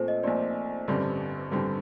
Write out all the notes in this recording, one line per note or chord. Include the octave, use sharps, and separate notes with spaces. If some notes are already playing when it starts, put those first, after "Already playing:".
Already playing: A#1 A#2 A3 C4 F4 A4 C5
D#5
A#1 A#2 A3 C4 D5
A1 G2 D3 G3 C4
A1 G2 D3 G3 C4